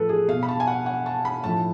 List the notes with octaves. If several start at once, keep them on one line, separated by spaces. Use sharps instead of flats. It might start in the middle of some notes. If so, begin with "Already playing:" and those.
Already playing: A2 F3 A4 B4
G#4
B2 F5
B5
A5
G#5
F#5
F#5
A5
B5
A2 F3 A5